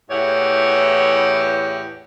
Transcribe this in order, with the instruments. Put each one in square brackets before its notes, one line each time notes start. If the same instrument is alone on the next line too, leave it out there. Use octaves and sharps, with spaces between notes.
[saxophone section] E2 A2 E3 G4 C#5 F#5